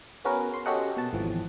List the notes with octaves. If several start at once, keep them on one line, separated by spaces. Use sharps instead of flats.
B3 C#4 F#4 G#4 A#4 B4
C6
C#4 F#4 G4 A4 D#5 F#5
B2 A5
G#1 E3 F3